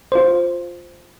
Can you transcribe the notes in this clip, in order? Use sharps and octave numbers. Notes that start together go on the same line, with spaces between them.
F4 C5